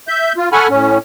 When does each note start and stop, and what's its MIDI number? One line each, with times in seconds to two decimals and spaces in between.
0.08 0.33 76
0.08 0.33 91
0.37 0.49 65
0.52 0.68 69
0.52 0.68 78
0.52 0.68 80
0.52 0.68 83
0.52 0.68 85
0.52 0.68 89
0.70 0.98 45
0.70 0.98 61